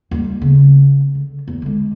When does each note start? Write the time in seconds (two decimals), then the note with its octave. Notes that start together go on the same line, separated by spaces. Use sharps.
0.11 D#2 G3
0.42 C#3 B3
1.15 D3
1.47 E2
1.62 D3 G#3